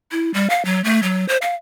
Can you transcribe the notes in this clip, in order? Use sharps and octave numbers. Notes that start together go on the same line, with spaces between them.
E4
G3
F5
F#3
A3
F#3
C5
F5